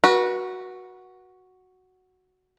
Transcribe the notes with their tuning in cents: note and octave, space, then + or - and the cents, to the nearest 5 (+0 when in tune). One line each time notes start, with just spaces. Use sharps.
F#4 +0 B4 -35